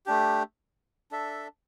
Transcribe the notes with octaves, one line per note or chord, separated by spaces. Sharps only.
A3 D4 G4
D4 A4 E5